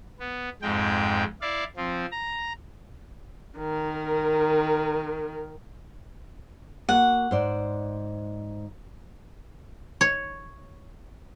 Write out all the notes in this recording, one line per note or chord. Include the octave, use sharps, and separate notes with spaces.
B3
F2 G#2 G#3 G5
E4 D5 F5
F3 C4
A#5
D#3 A#4
A#3 F#4 F#5
G#2 C5 D5
C#5